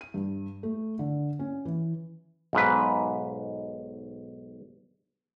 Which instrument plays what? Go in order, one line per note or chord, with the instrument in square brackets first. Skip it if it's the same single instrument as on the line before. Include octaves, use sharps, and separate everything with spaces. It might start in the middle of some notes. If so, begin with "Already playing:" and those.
[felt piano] D#7
G2
A3
D3
C#4
E3
[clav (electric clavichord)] B1 G#2 B4